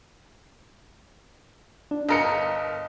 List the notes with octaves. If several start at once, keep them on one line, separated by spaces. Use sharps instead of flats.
D4
G1 A#4 D#5 C#7